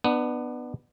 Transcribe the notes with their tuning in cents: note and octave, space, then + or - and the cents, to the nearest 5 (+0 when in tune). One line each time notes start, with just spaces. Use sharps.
B3 +0 D4 +30